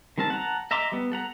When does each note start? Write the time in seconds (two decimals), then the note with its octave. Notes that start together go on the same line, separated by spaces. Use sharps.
0.18 D#3 G3 C4 A#4 A5
0.30 F#5 A5 A#5
0.71 D#5 E5 A#5 C6 D6
0.92 G3 B3
1.12 A4 F#5 A#5